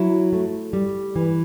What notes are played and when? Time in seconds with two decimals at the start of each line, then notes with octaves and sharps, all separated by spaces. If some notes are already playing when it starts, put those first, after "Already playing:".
Already playing: F#3 E4
0.33 A3
0.73 G3
1.16 E3